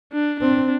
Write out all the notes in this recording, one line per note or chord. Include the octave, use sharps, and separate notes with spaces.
D4
C4 D4